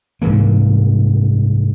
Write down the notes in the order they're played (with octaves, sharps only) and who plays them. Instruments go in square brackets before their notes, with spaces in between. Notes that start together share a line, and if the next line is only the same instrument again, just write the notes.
[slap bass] C2 G#2 E3 A#3